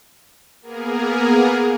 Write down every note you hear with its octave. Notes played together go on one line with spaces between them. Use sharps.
A#3 B3 G#4 A#4